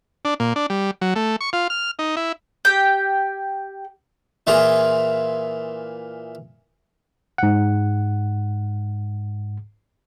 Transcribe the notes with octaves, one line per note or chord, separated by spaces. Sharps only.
D4
A#2
D4
G3
F#3
A3
C#6
F4
F6
D#4
E4
G4 G5
A#2 E3 F4 G#4
G#2 F#5